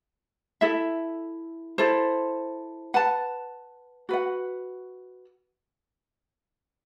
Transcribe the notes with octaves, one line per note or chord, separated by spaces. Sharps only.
E4 A4 E5
E4 A4 C5
B4 F#5 A5
F#4 B4 F#5